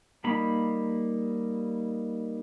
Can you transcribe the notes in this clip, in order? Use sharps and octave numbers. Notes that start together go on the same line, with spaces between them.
G3 A#3 D#4 B5